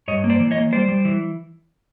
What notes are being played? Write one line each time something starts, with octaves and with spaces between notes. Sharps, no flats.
G2 C#5 D#5
A#3
C5 D5
E3
C#5 D#5
A#3
G3 C5 D5
G3
E3